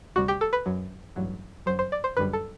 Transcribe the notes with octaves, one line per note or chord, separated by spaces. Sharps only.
D2 C3 G3 F#4
G4
A4
B4
F#2 F#3
A1 G2 F#3
G1 F#2 F#3 C5
C5
D5
C5
G1 F#2 D3 G3 B4
A4